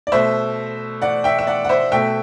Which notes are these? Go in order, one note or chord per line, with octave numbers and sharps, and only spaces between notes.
D5
B2 A3 C5 E5
D5 F#5
E5 G5
E5
D5 F#5
F#5
C5 E5
B2 A3 E5 G5